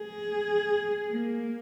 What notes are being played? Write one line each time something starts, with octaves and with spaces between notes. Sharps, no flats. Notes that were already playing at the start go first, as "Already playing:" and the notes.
Already playing: G#4
A#3